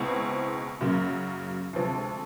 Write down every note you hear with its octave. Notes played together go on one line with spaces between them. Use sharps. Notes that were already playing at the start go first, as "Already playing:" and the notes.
Already playing: C#2 B2 G#3 C4 E4
F#2 C#3 F#3 A#3
D2 C3 F3 G#3